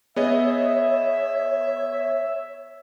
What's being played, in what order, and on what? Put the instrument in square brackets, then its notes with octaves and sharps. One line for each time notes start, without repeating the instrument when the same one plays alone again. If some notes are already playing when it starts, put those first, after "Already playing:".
[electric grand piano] B3 G#4 D#5 [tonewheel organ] C#5 [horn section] E5